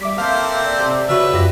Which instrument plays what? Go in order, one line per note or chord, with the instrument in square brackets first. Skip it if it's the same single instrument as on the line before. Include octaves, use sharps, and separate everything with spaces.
[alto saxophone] G3 [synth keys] E5 D6 B6
[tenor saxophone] A#3 [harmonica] C4 A4 C5 [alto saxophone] F5
[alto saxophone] D5
[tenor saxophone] C3
[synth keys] C#3 F#4 C#5 [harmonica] B4 [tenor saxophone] E5
[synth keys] F#2 F4 A#6 [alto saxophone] G4